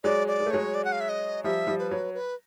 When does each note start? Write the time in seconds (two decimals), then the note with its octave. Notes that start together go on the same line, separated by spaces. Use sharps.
0.04 F#3 G#3 D5
0.28 D5
0.40 G#3
0.46 A3
0.51 F#3 G#3 C#5
0.75 D5
0.85 F#5
0.92 F5
1.00 E5
1.09 D#5
1.44 F3 G3 E5
1.67 F3 G3
1.79 B4
1.91 F#3
2.14 B4